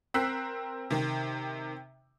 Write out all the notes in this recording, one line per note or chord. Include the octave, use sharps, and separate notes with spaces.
C4 A#4 E6 F#6 B6 C7
C3 D#3